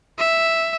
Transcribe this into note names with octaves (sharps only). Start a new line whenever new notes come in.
E5